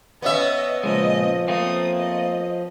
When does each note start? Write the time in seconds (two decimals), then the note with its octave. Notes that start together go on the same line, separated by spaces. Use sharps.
0.22 B3 C#4 D#5 E5
0.84 A#2 C#3 F3 G#3 D#5
1.48 A3 A#3 C4 D#6
1.97 D#5